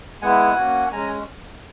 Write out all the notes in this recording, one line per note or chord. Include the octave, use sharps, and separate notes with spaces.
G#3 B3 E4 F#5 G#5
A#3 C#4 F#4
G#3 C#4 G#5 A#5